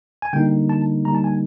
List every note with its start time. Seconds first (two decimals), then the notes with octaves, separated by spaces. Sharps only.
0.22 G#5
0.33 D3 G3 A#3 D#4 G5
0.69 A5
1.05 D3 G3 A#3 D#4 A#5
1.15 A5
1.24 G#5